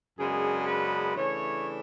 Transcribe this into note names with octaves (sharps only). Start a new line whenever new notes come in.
F#2 C#3 G#3 B3 D4 G#4
B4
C#3 E3 A3 D4 C#5